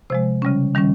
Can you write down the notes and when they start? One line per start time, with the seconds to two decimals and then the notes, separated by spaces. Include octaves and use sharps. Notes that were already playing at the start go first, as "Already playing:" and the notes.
0.10 C3 F3 G#3 C5
0.42 C#3 G3 C#4
0.75 D#3 G3 C#4